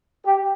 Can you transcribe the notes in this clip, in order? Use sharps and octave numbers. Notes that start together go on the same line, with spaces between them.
G4